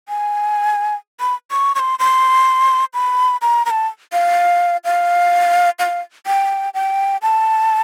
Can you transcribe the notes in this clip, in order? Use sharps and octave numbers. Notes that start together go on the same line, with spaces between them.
G#5
B5
C#6
C#6
C6
C6
B5
A#5
A#5
A5
F5
F5
F5
G5
G5
A5